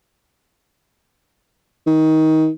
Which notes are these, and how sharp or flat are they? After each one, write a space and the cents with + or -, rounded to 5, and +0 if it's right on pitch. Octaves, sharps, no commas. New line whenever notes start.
D#3 +20